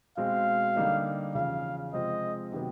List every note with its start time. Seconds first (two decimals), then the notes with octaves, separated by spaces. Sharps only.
0.17 B2 G#3 C4 F5
0.76 D3 G3 A#3 D#4
1.35 E2 C#3 F3 F5
1.93 C3 F3 G#3 C4 D#5
2.52 C3 D#3 F#3 B3